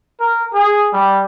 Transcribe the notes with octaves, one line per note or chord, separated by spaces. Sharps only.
A#4
G#4
G3